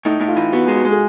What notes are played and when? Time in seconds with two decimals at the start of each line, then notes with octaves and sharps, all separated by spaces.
0.05 A2 D#4
0.20 A2
0.28 F4
0.37 E3
0.52 B3 F#4
0.68 G#3
0.76 F#4
0.85 G#3
0.92 G#4